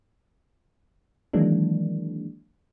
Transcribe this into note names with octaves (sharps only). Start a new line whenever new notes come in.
D#3 E3 F#3 G#3 A#3 D4